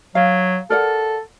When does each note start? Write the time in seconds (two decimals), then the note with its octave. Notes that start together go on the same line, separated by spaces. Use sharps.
0.15 F#3 F5
0.70 A4 A#4 D5 F#5